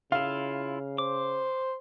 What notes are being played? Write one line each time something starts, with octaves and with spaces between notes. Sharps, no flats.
C#3 E4 F4 F5
C5 D6